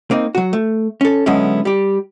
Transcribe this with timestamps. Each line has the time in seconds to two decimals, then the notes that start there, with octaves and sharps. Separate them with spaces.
0.11 A#3 C4 D#4
0.35 F#3 F#4
0.53 A3
1.01 C#4 A4
1.26 D3 F#3 G#3 B3 C#4 E4
1.65 G3 G4